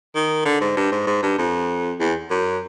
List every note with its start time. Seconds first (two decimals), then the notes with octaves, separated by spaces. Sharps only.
0.15 D#3
0.45 D3
0.61 G#2
0.77 G2
0.92 G#2
1.07 G#2
1.23 G2
1.38 F2
2.00 E2
2.30 F#2